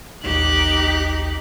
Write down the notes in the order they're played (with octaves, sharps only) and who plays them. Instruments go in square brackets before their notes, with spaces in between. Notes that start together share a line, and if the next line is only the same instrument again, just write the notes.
[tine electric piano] A1 D#2 [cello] D#4 G4 [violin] F#6